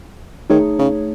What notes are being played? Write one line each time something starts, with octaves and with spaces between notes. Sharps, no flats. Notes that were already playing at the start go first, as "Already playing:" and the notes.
D#3 A3 D#4 G#4 C#5
C#3